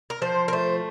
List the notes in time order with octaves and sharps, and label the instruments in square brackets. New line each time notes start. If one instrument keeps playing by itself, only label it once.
[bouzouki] A#4
F3 C5
A#4
A3 C5